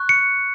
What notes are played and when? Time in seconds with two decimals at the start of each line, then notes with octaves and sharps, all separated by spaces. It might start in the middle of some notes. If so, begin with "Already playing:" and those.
Already playing: C#6 F#6
0.09 C#7